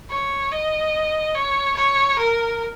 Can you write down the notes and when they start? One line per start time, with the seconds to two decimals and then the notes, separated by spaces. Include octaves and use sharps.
0.10 C#5
0.52 D#5
1.34 C#5
1.76 C#5
2.18 A#4